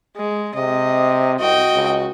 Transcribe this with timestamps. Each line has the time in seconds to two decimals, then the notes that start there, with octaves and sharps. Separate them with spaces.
0.17 G#3
0.55 C3 D#5
1.40 C2 F#4 D#5 G5
1.74 C#2